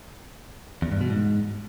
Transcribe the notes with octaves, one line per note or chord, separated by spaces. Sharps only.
E2
G2
B2
G#2